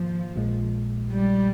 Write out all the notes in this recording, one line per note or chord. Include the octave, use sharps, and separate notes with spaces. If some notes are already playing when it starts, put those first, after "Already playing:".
Already playing: G#2 D#3 F3 A#3 F4
A#1 A#2 G#3
G3